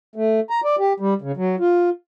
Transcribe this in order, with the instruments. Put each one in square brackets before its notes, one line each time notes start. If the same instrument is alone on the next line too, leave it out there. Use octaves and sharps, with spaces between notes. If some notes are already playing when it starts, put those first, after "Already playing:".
[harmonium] A3
A#5
D5
G4
G3
C#3
F#3
F4